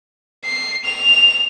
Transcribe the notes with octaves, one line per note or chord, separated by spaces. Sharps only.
C7
F7